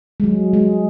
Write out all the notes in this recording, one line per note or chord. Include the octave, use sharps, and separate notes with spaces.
G#3
F#3
G#3